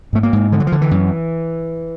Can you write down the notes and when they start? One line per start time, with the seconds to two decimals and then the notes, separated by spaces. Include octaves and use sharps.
0.13 G#2 A3
0.23 A#3
0.33 G#2
0.52 D3 F3
0.60 F#3
0.67 F3
0.72 D3
0.81 E3
0.91 F#2